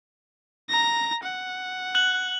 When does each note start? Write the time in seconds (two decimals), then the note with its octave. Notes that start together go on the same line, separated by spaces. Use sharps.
0.70 A#5 A#6
1.23 F#5
1.95 F#6 F#7